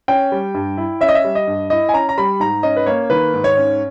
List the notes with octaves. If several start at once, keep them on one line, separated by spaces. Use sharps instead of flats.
C#4 G5
G3
G2
E4
C#4 E5
D#5
E5
G3
D#5
G2
E4 D#5
G#5
C#4 A#5
A#5
G3 B5
G#2 A#5
C#4 D#5
B4
A#3 C#5
D#3 B4
G#2
C#5
C#4